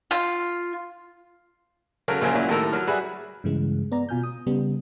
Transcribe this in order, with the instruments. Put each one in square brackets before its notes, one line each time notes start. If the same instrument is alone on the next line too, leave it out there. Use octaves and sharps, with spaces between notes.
[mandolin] F4
[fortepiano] C#3 F#3 A4 A#4 F6
A#1 C#3 F#3 A#4 C5 G#5
A#2 F#3 C#4 E4
D#2 A2 A4 A#4 E6
F#3 F6
G3 F#4 G#4 B4 E5
[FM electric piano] G2 C#3 E3 G#3
B3 D5 A#5
B2 F4 G#5 F6 G6
D#6
C#3 G3 B3